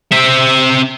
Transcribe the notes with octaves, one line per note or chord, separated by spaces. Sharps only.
C4 E5